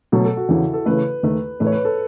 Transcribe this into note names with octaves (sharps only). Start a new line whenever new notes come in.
B2 F#3 A3 A4
A4
F#4
E2 C#3 E3 E4
A4
C#3 E3 A3 B4
D#2 D#3 A3
A2 E3 A3 B4
C#5
B4
A4